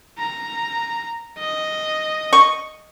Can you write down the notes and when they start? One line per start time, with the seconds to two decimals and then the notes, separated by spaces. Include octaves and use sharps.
0.19 A#5
1.38 D#5
2.33 C#6